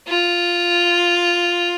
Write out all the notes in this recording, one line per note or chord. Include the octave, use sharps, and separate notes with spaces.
F4